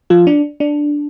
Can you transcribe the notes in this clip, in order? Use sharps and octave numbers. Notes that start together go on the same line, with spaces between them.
F3 F4
D4
D4